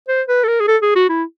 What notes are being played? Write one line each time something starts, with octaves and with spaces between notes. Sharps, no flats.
C5
B4
A4
A#4
G#4
A4
G#4
F#4
E4